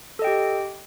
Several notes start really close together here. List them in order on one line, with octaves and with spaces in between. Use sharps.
A4 D#5 G5 G4